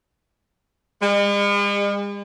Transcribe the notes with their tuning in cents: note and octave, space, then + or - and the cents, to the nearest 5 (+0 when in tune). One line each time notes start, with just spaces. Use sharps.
G#3 -45